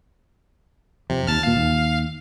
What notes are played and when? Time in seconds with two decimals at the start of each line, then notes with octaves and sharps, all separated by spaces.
1.10 F2 C3
1.27 D#2 A5 F6
1.43 D#2 A#2 F5
1.56 D#2